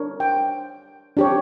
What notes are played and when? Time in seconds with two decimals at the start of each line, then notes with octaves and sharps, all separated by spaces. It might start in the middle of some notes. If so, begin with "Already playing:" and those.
Already playing: D4 A#4 C#5
0.20 G5
1.17 D4 G4 C#5